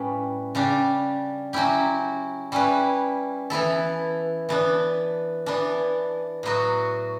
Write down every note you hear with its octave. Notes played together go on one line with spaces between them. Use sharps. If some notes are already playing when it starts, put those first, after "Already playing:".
Already playing: A2 G3 C#4 B4
C#3 G3 D4
F#3 C#4 E4 G4
G3 C#4 E4 B4
E3 B3 E4 A4
E3 B3 D4
E3 B3 D4
A2 F#3 B3 F#4